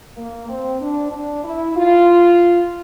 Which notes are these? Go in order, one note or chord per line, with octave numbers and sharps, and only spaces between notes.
A#3
C4
D4
D4
E4
F4